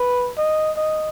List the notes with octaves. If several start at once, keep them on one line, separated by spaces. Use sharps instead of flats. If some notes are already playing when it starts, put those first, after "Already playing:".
Already playing: B4
D#5
D#5